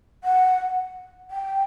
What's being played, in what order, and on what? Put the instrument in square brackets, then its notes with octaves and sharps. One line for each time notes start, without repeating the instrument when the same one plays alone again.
[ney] F#5
G5